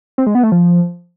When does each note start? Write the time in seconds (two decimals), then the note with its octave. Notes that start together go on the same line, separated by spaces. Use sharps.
0.18 C4
0.26 G#3
0.35 B3
0.43 A3
0.52 F3